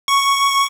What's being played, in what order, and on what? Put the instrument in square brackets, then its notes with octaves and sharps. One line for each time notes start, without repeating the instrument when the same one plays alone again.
[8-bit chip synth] C#6